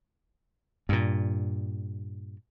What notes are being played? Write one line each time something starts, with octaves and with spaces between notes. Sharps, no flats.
G2 A#2